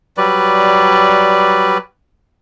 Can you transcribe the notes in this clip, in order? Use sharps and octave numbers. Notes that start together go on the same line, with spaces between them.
F#3 G3 B4 D5